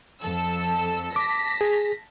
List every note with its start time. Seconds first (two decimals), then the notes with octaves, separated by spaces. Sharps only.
0.21 F2 A4 E6
1.16 A5 D6 A#6 B6
1.61 G#4